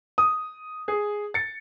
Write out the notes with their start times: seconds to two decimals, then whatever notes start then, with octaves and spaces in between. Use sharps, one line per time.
0.18 D#6
0.88 G#4
1.34 A6 C#7